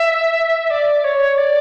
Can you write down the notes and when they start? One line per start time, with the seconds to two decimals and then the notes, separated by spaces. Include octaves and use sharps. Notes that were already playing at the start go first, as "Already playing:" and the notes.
Already playing: E5
0.70 D5
1.04 C#5
1.37 D5